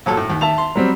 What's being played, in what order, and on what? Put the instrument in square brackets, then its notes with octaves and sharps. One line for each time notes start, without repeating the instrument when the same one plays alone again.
[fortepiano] A#2 F#3 A4
A2
D#2
[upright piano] E5 A5 F7
[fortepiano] C6
[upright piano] F#3 G3 C4